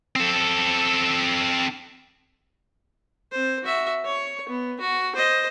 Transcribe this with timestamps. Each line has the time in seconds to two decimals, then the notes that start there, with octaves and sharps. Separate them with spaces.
0.16 C4 A4
3.32 C4 C5
3.64 F#4 E5
4.05 C#5 C#6
4.49 B3
4.80 F#4
5.16 C5 D#5